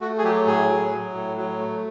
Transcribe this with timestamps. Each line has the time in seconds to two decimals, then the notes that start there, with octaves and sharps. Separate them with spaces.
0.01 A3 F#4
0.18 G#4
0.23 F#3 G4
0.46 A2 G#4
0.68 F#3
0.91 F#3
1.14 A2
1.37 F#3
1.58 A3